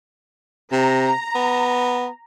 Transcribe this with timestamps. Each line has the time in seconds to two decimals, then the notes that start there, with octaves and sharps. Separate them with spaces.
0.72 C3 A#5
1.35 B3